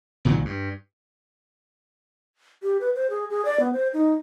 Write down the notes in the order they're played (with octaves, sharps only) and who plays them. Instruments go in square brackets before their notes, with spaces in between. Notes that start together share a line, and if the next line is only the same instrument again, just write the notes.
[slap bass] C2 A#2 D#3 F#3
G2
[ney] G4
B4
C5
G#4
G#4
D5
B3
C5
D#4